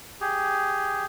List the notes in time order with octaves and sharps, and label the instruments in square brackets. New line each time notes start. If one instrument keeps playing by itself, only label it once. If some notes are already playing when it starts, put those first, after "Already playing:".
[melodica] G4 G#4